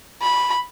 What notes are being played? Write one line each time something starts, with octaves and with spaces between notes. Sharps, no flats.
B5